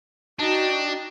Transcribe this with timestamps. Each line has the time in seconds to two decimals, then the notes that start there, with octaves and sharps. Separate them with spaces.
0.39 D4 D#4 F#4 G5